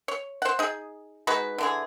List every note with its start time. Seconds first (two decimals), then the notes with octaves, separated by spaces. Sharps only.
0.08 C#5
0.42 C5 F#5
0.59 D#4 G#4
1.27 G#3 D#4 F#4 B4
1.58 D3 E3 G#4